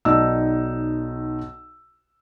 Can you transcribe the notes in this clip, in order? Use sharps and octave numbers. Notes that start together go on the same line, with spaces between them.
B1 D#4 D5 D#5 A5 E6